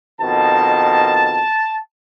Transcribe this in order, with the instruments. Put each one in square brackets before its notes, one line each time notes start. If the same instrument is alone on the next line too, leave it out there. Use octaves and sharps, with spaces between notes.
[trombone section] F2 B2 D#3 [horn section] A5